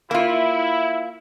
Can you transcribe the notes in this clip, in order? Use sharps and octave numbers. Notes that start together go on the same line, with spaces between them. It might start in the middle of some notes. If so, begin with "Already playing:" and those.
A#3 E4 F4